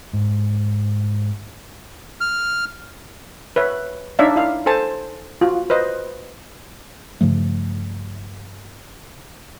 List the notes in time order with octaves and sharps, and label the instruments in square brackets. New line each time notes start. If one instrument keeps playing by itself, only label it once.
[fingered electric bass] G#2
[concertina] F6
[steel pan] B4 C#5 E5
D4 D#4 C#5 D5 E5 F5
E4 F5
A4 C5 G#5 A5
F4 F#4
B4 C5 D#5
[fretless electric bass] G2 C#3 F3 A3